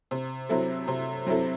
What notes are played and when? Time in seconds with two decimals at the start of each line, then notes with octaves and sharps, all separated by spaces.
0.11 C3
0.49 F#3 C4 E4 A4
0.88 C3
1.27 F#3 C4 E4 A4